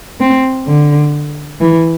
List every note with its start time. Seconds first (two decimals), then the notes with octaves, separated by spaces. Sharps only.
0.20 C4
0.67 D3
1.61 E3